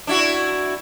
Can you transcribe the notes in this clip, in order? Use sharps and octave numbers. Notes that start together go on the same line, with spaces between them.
D4 E4 F#4